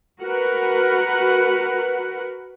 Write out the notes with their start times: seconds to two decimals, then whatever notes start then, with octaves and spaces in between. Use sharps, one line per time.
0.22 F#4 A#4 B4 F#5